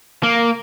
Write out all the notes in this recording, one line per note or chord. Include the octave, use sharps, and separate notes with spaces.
A#3